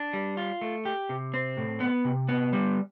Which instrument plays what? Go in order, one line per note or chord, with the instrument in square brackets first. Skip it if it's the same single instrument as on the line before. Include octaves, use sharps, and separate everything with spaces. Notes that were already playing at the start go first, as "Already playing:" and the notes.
Already playing: [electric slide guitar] D4
G3
F4
A3
G4
C3
C4
A2
B3
C3
B3
G3